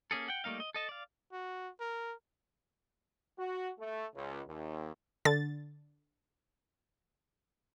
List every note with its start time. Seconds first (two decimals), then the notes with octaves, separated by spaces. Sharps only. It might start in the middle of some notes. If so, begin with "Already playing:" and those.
0.11 A#3 C#4 G#4 A4
0.28 F#5 G5
0.44 G3 A3 A#3 D#4 F5
0.60 D#5
0.74 A4 D#5 A5
0.89 D5 F5
1.32 F#4
1.80 A#4
3.38 F#4
3.79 A3
4.15 C#2
4.48 D#2
5.25 D3 A6